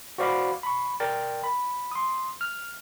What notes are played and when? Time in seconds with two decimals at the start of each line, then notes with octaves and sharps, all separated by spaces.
0.18 F#4 C5 D5 F5 B5 D6
0.63 B5 C#6
1.00 A#4 D5 G5 A6
1.44 B5
1.92 C6 D#6
2.41 F6